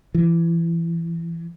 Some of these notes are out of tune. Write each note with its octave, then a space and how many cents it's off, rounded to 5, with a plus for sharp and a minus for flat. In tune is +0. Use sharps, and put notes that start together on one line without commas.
E3 +25